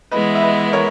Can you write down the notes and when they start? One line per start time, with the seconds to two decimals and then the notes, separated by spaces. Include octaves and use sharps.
0.11 E3 G#3 B3 E4 B4 D#5
0.35 E5
0.42 B4 D#5
0.73 A#4 C#5